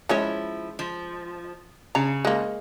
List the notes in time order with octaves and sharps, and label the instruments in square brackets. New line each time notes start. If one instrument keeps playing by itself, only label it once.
[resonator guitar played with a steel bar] F3 E4 [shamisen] G#3 C#4 C#5
[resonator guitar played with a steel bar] F3
[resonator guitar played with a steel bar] C#3 [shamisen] A#5
[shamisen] G#3 A#3